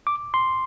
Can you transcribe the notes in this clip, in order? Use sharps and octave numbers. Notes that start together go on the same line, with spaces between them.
D6
C6